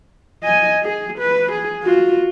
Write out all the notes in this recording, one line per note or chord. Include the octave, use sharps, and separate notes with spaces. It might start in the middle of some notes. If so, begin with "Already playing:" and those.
D#5 G#5
G#4
B4
G#4
F4 F#4